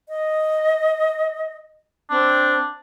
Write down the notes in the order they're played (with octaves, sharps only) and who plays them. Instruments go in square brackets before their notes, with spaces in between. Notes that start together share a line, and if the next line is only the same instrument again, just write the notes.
[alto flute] D#5
[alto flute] C4 [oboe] D4